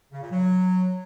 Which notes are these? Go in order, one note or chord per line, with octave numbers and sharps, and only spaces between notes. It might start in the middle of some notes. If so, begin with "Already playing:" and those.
C#3
A#2
F#3